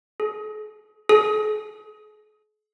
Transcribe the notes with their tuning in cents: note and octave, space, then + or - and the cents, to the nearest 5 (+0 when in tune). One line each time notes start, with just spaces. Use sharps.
G#4 +45
G#4 +45